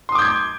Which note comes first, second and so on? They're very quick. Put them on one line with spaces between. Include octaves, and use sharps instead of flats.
C6 D#6 D6 G6 G#6